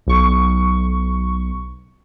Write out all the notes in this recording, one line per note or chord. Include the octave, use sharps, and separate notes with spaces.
B1 C#6